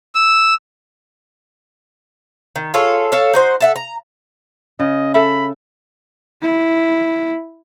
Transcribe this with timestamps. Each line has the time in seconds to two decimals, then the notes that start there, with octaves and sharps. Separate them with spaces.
0.15 E6
2.56 D#3
2.74 F4 G#4 A4 C#5
3.12 A4 C#5 F5
3.34 D#4 F#4 C5
3.60 A4 E5 F#5
3.76 A#5
4.80 C#3 D#5
5.14 A4 E5 B5
6.42 E4